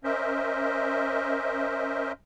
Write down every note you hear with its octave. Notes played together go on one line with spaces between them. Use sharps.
C#4 A#4 C5 D#5 E5